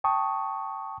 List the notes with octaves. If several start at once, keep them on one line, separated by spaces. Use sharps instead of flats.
G5 A5 C#6 D#6